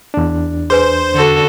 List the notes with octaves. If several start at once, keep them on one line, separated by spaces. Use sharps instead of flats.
E2 D4
G#4 B4 C5 G#5
D3 F#4 A4